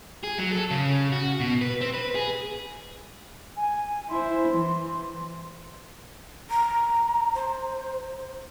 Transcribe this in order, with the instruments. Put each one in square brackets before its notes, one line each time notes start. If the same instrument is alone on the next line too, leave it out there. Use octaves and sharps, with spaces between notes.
[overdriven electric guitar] G#4
F#3
A4
C#3
F#4
B2
B4
C4
B4
G#4
[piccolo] G#5
[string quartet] E4 C5 [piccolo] C6
[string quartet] E3
[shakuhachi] A#5
C5